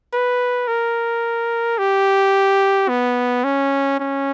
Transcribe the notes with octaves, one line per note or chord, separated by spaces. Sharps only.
B4
A#4
G4
B3
C#4
C#4